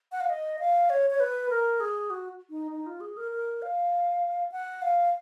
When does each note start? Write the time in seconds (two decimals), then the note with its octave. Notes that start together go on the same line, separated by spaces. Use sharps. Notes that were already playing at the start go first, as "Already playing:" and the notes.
0.12 F#5
0.20 F5
0.30 D#5
0.59 F5
0.90 C#5
1.10 C#5
1.20 B4
1.50 A#4
1.80 G#4
2.10 F#4
2.50 D#4
2.71 D#4
2.86 F4
3.01 G#4
3.17 A#4
3.31 A#4
3.62 F5
4.52 F#5
4.82 F5